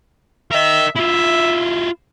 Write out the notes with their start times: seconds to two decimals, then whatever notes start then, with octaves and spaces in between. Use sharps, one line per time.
0.51 A#4 D#5 E5
0.96 E4 F4 E5